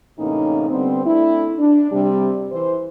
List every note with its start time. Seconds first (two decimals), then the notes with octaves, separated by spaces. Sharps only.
0.19 A2 C3 E3 A#3 C#4 D#4
0.70 D3 G3 B3 C4
1.06 A3 C4 D4 E4
1.59 D4
1.91 C3 G3
2.52 E3 C5